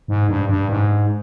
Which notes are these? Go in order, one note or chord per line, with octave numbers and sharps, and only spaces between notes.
G#2
G2
G2
G#2